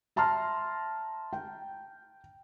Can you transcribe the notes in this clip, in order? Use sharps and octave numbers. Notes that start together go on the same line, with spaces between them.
E5 A5 A#5 C6 F6
G5